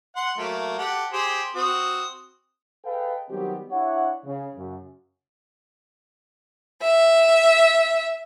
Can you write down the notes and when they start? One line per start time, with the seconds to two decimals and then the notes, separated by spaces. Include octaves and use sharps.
0.16 F#5 C6
0.38 F#3 A3 A#3
0.78 G4 A4 F#5
1.12 G4 G#4 C5
1.55 C4 F#4 D#6
2.85 G#4 A4 B4 D#5 F5 G5
3.30 D#3 F#3 G3 B3 C4 G4
3.71 D4 E4 C#5 E5 F#5
4.25 C#3
4.56 F#2 C#3
6.81 E5